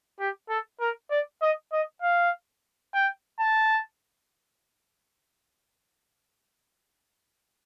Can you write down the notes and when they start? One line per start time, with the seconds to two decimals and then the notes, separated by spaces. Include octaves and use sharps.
0.19 G4
0.49 A4
0.80 A#4
1.11 D5
1.42 D#5
1.73 D#5
2.02 F5
2.94 G5
3.40 A5